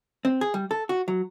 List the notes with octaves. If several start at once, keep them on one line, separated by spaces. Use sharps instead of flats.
C4
G#4
G3
A4
F#4
F#3